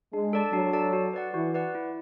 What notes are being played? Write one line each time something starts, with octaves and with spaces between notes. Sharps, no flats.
G#3 D4
A4 D5 A5
F#3 D4
A4 D5 A5
F#4
B4 D5 F#5
E3 F#4
B4 D5 F#5
E4